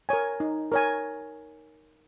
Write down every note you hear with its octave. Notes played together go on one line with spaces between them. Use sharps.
A#4 C#5 G#5
D#4
A#4 C#5 G#5